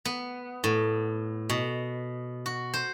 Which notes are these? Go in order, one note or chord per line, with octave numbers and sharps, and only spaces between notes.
B3
A2
B2
F#4
C5